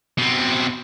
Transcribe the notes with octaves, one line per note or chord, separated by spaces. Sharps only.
B2 C4